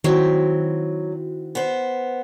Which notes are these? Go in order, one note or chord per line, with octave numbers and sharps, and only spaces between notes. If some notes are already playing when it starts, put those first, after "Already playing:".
D#3 F#3 C4 E4 F#4
B3 C5